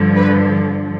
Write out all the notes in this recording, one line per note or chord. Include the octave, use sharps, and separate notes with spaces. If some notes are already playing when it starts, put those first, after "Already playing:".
Already playing: G2 D3 F3
B4